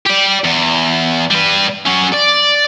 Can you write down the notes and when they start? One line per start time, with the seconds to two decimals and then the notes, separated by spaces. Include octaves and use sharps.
0.07 G4 D5
0.45 E2
1.31 G3 B4
1.87 F#3 C#4
2.14 D5